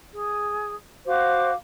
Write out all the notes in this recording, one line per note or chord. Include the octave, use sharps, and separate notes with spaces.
G#4
F#4 C5 F5 D6